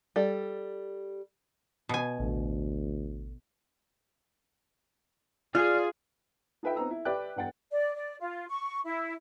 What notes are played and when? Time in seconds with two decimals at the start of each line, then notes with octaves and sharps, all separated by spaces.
0.16 G3 A4
1.89 B2 G#5
2.19 A1 D2
5.55 F4 G#4 D5 F6
6.63 D#4 F4 B4 E5 G5
6.76 B3 C4 D#4 A#5 E6
6.90 E4
7.05 G4 B4 D5 E5 G5 F#6
7.36 E2 G2 F#5 G5 A6
7.72 D5
7.95 D5
8.20 F4
8.49 C#6
8.85 E4